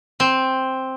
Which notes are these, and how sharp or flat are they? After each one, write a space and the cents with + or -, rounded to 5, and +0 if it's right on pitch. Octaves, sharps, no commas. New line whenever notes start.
C4 +5